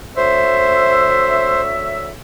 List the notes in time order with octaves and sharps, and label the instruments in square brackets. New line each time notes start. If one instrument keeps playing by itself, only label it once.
[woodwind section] D2 C#5 E5 [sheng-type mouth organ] C5